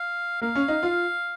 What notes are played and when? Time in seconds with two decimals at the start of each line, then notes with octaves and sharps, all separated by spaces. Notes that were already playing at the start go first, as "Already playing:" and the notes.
Already playing: F5
0.41 A#3 F5
0.55 C#4
0.68 D#4
0.83 F4